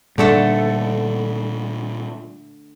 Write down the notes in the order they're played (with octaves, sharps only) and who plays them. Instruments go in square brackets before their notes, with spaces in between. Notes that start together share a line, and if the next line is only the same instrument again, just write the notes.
[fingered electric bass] A#2 G3 [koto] D3 A3 A4